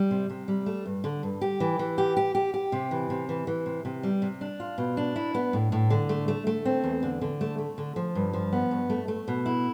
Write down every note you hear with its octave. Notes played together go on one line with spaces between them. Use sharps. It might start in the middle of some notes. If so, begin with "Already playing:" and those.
Already playing: G3
C3
C3
G3
A3
G2
D3
G2
G4
E3
E3
G4
G4
G4
G4
C3
E3
C3
E3
E3
C3
C3
G3
C3
D4
F4
B2
D4
E4
B3
A2
A2
D3
A3
A3
A3
C4
E2
D3
D3
A3
A3
D3
F3
G2
F3
B3
G2
A3
A3
B2
E4